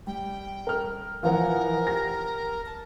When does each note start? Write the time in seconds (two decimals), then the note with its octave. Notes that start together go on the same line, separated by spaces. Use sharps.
0.07 G3 G5
0.67 A#4 F6
1.23 E3 F3 F4 A#4 F#5
1.87 G4 A#6
2.66 A5